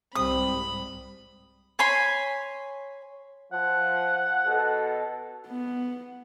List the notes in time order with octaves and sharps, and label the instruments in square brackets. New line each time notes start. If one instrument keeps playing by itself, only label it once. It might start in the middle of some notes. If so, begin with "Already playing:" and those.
[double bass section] C2 G#2 G3 [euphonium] C4 [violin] B5 [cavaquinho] D#6
[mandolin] C#5 G#5 B5 C6
[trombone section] F3 [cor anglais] F#5
[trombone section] B2 F#4 A4
[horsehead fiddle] B3